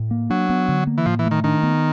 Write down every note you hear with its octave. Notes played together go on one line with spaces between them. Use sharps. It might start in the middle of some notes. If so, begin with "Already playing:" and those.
Already playing: A2
A#3
F#3 D4
B3
D3
A#3
E3
A2 F3
E3
A3
D#3
D#3 D4
B3